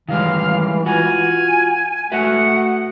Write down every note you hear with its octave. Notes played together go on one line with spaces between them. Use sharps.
D#3 E3 G3 G#3 F5
F4 F#4 G#5
A3 F#4 B4 E5 F#5